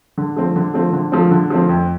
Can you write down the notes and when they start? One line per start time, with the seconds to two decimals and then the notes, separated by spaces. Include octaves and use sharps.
0.18 D3
0.36 F3 A3 C4
0.56 D3
0.74 F3 A3 C4
0.93 D3
1.12 F3 A3 C4
1.31 D3
1.50 F3 A3 C4
1.69 F2